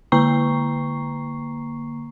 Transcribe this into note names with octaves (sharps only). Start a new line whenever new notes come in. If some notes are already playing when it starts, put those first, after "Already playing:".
D3 A#3 A#5 C#6 C7